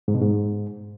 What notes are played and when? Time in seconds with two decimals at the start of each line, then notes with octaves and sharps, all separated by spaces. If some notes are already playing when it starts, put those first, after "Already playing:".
0.08 G#2
0.15 B2
0.21 G#2